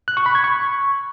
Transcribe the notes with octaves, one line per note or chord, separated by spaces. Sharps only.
F#6
C#6
B5
G#6
C#6